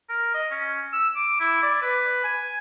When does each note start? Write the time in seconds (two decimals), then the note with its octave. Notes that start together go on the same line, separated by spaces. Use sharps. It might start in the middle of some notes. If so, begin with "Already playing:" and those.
0.09 A#4
0.34 D#5
0.51 C#4
0.93 E6
1.15 D6
1.40 E4
1.62 D5
1.82 B4
2.24 G#5